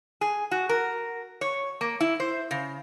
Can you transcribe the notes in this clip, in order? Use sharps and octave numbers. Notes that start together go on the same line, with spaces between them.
G#4
F#4
A#4
C#5
A#3
E4
C5
C#3